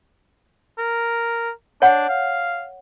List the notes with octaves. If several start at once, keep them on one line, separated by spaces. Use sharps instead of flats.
A#4
D4 C#5 F#5
F5